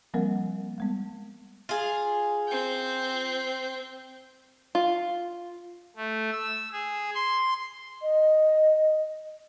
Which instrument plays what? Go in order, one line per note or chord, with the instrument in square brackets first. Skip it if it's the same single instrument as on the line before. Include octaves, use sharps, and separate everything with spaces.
[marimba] F3 G3 A#3 C4 A#4 F#5
G3 G#3 B3
[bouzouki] F4 G#4
[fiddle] C4 G5
[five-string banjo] F4
[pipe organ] A3
E6
G#4
C6
[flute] D#5